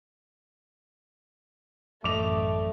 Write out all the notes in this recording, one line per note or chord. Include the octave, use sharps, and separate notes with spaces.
A1 F#2 A3 D5 D#5 D6 F7